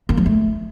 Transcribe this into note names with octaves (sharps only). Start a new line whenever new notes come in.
A#3
F3
A3